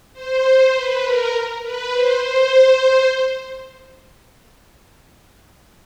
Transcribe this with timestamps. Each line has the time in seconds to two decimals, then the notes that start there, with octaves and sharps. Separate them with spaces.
0.13 C5
0.72 B4
1.01 A#4
1.61 B4
1.91 C5
2.20 C5